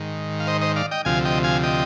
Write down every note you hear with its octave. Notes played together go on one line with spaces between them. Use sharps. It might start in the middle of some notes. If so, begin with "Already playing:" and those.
Already playing: G#2 D#3
F5
C5 D#5
C5 D#5
D5 F5
D#5 G5
D2 C3 F3 F5 G#5
D#5 G5
F5 G#5
D#5 G5